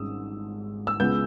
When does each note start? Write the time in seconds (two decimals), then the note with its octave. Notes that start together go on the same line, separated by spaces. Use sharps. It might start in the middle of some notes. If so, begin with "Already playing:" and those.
Already playing: G#1 G#2 G3 C#4 D#6 E6
0.87 E6
1.00 C#2 C#3 G#3 B3 G6